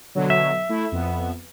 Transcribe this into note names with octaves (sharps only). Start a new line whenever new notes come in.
B2 D3 F#3
E5
A3 E4
F2 B3